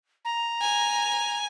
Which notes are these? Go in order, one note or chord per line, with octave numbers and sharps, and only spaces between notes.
A#5
G#5